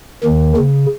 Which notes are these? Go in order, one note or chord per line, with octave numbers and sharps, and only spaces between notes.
D#2 D#3
C#3